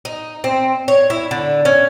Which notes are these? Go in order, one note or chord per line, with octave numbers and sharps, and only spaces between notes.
D#4
C4
C#5
E4
D3
C#4